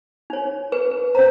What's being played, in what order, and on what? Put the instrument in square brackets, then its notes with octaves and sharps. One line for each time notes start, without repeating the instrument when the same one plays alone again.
[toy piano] D#4 C#5
B4
B4
[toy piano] C#4 A#5 [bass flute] C5